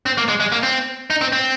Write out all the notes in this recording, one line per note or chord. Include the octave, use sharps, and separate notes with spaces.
C4
A#3
G#3
G#3
A#3
C4
D#4
C4
C4